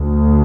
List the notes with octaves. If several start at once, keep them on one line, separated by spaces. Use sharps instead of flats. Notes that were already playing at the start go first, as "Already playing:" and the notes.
Already playing: D2